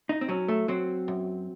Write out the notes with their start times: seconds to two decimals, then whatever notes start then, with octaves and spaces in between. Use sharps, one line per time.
0.09 D#4
0.21 C4
0.28 F#3 C#4
0.48 A3
0.68 F#3 C4
1.08 F#2